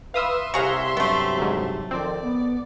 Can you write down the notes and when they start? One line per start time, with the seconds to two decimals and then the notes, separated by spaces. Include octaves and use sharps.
0.14 B4 E5 F5 C6 D#6 E6
0.54 C2 C3 F#4 G#4 C#5 F5 F#5 A#5
0.97 G2 C3 F#3 A3 B3
1.38 D2 G#2
1.91 F2 D#3 C4 D5
2.23 B3